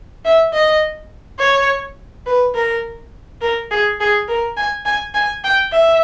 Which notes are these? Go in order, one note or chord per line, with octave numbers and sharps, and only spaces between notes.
E5
D#5
C#5
B4
A#4
A#4
G#4
G#4
A#4
G#5
G#5
G#5
G5
E5